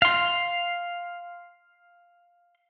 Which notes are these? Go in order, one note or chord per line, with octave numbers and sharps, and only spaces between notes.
F5 C6